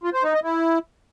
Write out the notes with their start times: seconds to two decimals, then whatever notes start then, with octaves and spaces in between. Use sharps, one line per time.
0.03 F4
0.13 C5
0.24 D#4
0.34 D#5
0.44 E4